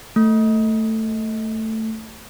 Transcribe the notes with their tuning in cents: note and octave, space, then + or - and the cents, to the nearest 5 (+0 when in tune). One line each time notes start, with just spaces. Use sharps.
A3 +10